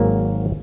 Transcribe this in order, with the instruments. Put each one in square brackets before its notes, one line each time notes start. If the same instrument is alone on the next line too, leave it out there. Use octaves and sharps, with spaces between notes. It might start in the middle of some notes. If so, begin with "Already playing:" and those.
Already playing: [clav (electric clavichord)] G#1 G#2 F#3 A#3